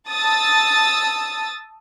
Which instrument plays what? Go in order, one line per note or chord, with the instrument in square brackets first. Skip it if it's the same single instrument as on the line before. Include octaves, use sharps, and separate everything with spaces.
[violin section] A5 D#6 E6 A6